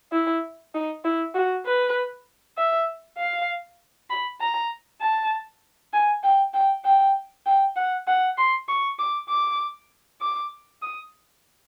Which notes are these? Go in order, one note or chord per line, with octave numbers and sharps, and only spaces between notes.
E4
D#4
E4
F#4
B4
E5
F5
B5
A#5
A5
G#5
G5
G5
G5
G5
F#5
F#5
C6
C#6
D6
D6
D6
D#6